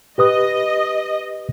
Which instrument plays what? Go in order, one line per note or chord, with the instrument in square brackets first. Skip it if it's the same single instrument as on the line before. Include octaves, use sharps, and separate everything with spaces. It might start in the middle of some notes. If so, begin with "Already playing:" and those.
[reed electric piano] G4 B4 D#6 [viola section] D#5